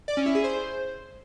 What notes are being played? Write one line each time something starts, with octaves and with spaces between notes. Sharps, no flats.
D5
C#4
E4
G#4
C5